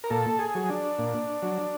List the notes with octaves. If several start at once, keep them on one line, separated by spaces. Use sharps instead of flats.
A#4
A#2 A4
G#4
F#3
D4
A#2
F#3